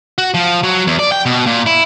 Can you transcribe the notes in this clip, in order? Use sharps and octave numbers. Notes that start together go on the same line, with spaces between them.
F#4
F3
F#3
E2
D5
G5
B2
A#2
E4